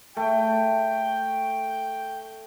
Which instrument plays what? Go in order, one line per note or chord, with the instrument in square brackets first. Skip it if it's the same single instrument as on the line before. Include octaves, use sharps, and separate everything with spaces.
[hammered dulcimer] A3 [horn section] G5